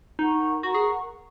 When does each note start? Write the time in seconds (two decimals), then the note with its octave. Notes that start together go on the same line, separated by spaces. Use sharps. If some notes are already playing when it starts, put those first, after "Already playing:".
0.19 D#4 A#4 F#5 A#5 C#6
0.63 F#4 A#4 F#5 A#5 C#6
0.74 G#4